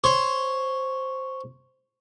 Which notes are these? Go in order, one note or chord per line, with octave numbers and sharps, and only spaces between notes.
C5 C#5